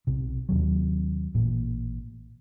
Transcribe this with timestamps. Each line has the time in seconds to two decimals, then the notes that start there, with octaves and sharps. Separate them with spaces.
0.07 B1 C3
0.49 D#2 C3 F#3
1.35 A1 A#2